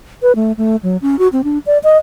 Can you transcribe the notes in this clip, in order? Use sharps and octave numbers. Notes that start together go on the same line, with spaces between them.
B4
A3
A3
F#3
C#4
F#4
C4
D4
D5
D#5